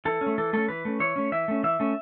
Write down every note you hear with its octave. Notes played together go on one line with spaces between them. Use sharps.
E3 A4
C#4
A3
E3 A4
A3 C#4 A4
E3 B4
A3 C#4
E3 C#5
A3 C#4
E3 E5
A3 C#4
E3 E5
A3 C#4